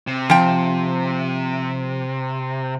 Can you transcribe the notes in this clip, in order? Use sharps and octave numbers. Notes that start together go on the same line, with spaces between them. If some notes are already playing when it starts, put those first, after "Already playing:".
C3
F3 G5